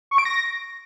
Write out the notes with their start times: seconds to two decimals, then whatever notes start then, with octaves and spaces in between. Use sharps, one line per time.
0.11 C#6
0.18 D7
0.25 A#6